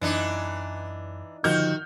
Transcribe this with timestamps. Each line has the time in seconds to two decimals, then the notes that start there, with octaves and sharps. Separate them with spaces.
0.01 F#2 E3 D4 D#4
1.44 D3 D#3 F3 F4 F#4 F6 G6